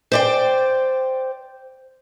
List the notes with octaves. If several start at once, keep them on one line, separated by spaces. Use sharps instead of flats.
C5 D5 G5